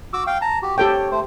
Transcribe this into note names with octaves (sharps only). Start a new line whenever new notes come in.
F#4 D6 E6
F5 G5
A5 A#5
F#4 G4
G4 A4 C#5 G5
A3 C5